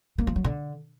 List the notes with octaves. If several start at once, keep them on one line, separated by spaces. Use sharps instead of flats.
A#3
F3
F#3
D3